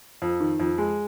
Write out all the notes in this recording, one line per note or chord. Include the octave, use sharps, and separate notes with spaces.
F2
D#3
F2
G#3